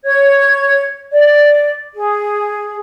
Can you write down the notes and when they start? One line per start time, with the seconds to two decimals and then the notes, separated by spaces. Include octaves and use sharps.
0.05 C#5 G#6
1.11 D5
1.94 G#4